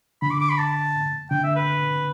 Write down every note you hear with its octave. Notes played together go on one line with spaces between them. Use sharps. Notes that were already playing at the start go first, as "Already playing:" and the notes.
D3 B5
D6
D6
B5
A5
D3 G5
E5
B4